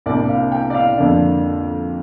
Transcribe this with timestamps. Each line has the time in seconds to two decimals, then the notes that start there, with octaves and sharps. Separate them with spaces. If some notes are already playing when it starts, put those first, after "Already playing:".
0.06 C2 C3 A#3 D4 D5
0.28 F5
0.52 G5
0.70 D5
0.75 F5
0.98 F2 D3 A#3 D4